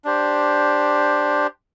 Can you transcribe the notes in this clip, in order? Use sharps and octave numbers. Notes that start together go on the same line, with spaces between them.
D4 G4 C5